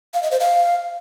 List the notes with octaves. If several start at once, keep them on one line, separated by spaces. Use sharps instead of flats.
F5
D#5
C5
F5